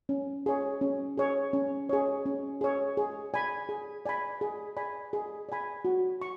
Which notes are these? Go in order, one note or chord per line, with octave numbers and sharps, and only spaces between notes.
C#4
G#4 C#5
C#4
G#4 C#5
C#4
G#4 C#5
C#4
G#4 C#5
G#4
D5 G#5 B5
G#4
D5 G#5 B5
G#4
D5 G#5 B5
G#4
D5 G#5 B5
F#4
C#6